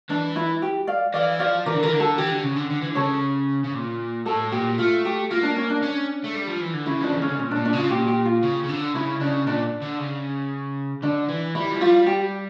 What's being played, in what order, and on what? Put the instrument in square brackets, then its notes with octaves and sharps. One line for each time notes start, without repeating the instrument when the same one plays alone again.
[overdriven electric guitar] E3 [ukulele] D4
[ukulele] E4
G4
D5 F5
[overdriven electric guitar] E3 [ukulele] D5 F5
[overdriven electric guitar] F3 [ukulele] D5 F5
[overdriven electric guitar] E3 [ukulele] A#4 D5
[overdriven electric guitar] D3
[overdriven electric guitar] E3 [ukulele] A#4
[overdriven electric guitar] D3
[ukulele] A4
[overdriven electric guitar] E3 [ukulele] G4
[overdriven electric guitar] D3
C#3
D3
D3
E3
D3
[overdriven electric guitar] C#3 [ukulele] A4 C#5
[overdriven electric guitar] C#3
A#2
[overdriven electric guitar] A2 [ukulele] A4
[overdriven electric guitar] A#2 [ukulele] G4
[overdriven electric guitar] A3 [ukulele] F4
[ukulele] G4
[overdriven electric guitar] A#3 [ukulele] F4
[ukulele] D4
C#4
D4
[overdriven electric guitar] C#4
A3
G3
F3
E3
D3
[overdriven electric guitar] C#3 [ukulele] E4
[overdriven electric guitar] F3 [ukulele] D4
[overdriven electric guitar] E3
[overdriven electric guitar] D3 [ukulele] C#4
[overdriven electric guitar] C#3
[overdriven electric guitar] A#2 [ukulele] C#4
[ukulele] D4
[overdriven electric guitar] A#2
[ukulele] D4
[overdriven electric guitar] C#3 [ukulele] F4
[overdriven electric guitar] A#2 [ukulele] G4
[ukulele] G4
F4
[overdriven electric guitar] C#3
C#3
D3
[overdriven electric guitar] C#3 [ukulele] E4
[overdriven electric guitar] C#3 [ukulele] D4
[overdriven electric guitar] A#2 [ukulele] D4
[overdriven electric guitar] D3
C#3
[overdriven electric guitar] D3 [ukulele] D4
[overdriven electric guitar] E3
[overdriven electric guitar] G3 [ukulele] E4
[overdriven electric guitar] F3
[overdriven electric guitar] G3 [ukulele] F4
[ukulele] G4